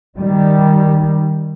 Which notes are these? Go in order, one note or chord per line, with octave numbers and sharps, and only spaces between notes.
D#3 G3